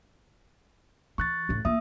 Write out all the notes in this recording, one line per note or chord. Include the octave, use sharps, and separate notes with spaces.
E3 C#6 F#6 A6
F#2 A2
A#3 F4 E5 D#6